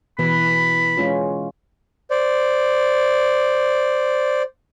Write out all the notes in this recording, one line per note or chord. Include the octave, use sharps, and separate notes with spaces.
B2 E3 B4 B5
G#3 C#4 F4
C5 D5